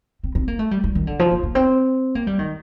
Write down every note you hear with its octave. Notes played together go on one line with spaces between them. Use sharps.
C4
C4
A#3
A3
G3
G3
D#3
D3
F3
A#3
A#3
C4
A#3
G3
D#3